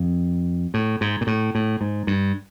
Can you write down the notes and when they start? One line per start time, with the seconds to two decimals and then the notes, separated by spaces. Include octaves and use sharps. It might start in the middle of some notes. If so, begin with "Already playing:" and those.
Already playing: F2
0.74 A2
1.01 G#2
1.21 A#2
1.27 A2
1.55 A2
1.81 G#2
2.07 G2